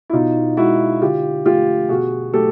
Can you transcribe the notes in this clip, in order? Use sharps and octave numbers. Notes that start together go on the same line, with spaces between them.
E4
B2 D#4 F4
G#3 E4 F#4
D3 F4 G4
F3 A3 F4 G4
B2 F#4 G#4
F#3 A3 G4 A4